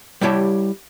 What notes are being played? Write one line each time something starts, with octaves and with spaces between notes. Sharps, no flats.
G3 E4 G4 C#5 A5